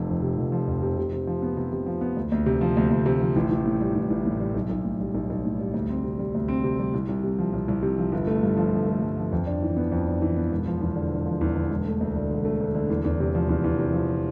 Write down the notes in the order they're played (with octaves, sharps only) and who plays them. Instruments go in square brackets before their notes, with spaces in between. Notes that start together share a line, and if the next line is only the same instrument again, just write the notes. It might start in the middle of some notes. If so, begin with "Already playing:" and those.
Already playing: [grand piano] F1 F3
F2
C3
F1
F3
F2
C3
C3
C3
F3
B3
C3
C3
F3
B3
D2
D2
C3
F3
D2
D2
C3
F3
A1
A1
A2
G3
A1
A1
A2
G3
B1
B1
A2
G3
B1
B1
A2
G3
D2
C4
C3
G3
D2
C4
C3
G3
C2
C2
C3
F3
C2
C2
C3
F3
G1
A3
G2
F3
G1
A3
G2
F3
F2
D4
E3
B3
F2
D4
E3
B3
E1
F3
E2
D3
E1
F3
E2
D3
E1
A3
D2
D3
E1
A3
D2
D3
E2
E2
C3
F3
E2
E2
C3
F3